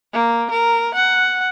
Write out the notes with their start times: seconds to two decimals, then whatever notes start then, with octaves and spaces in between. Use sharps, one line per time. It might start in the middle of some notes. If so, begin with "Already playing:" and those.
0.13 A#3
0.50 A#4
0.94 F#5